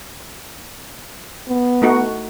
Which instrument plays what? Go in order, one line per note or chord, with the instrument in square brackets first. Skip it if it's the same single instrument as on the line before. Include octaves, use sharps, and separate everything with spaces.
[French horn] B3
[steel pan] A3 D#4 F#4